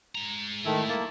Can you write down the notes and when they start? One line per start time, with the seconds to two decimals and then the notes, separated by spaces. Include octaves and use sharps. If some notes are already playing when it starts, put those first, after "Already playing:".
0.15 G#3 A#5
0.65 D#3 A3 E4
0.89 A#3 A5